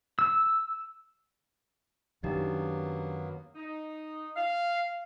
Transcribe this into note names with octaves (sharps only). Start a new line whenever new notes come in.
E6
F#2 D#3 F#3 A#3 B3 D4 D#4 G4
D#4
F5